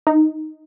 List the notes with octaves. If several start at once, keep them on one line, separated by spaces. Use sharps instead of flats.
D#4